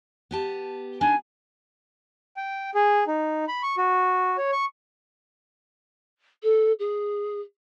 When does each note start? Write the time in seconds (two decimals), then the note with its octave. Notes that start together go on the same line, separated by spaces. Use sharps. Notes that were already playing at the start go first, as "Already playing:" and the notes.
0.31 B3 G4 A5
1.01 D4 D#4 G#5
2.37 G5
2.75 G#4
3.07 D#4
3.48 B5
3.63 C#6
3.77 F#4
4.38 C#5
4.53 C#6
6.43 A4
6.79 G#4